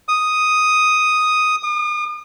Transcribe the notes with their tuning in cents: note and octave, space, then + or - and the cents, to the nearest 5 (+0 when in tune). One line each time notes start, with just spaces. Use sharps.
D#6 +0
D#6 -45